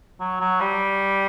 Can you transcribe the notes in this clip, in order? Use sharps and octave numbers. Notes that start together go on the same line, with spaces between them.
F#3
F#3
G3